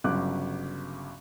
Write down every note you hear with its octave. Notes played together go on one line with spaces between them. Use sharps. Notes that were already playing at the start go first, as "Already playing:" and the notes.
G1 C#3 F#3 D6 F#6